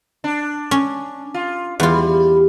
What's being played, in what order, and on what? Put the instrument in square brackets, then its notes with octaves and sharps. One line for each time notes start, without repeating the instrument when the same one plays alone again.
[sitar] D4
[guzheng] C#4
[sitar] F4
[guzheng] E2 F4 [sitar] G3